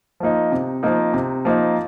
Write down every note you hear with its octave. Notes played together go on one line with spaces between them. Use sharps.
F3 A#3 D#4
C3
F3 A#3 D#4
C3
F3 A#3 D#4